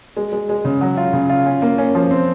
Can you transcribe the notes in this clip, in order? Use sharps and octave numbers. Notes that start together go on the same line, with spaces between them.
G#3
G#3
G#3
C#3
F#3
F4
C#3
F4
C#4
A#3
C#4
F3
C4